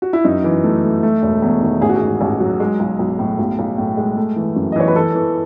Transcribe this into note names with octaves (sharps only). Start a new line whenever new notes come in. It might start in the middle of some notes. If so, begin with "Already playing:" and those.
F#4
E4
F#2 D#4
E3
A3
A3
A3
E1
E2
D#3
A1 G#4
F#4
G#4
G#2
A1
F#3
G#3
B1
B1
A2
B1
B1
A2
G#3
A3
E3
F#2
D#5
E3 C#5
B4
E3 A4
E3